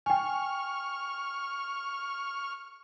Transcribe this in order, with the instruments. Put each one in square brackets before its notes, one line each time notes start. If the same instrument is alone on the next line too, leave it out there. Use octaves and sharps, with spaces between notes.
[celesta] G5 G#5 [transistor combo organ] C#6 F6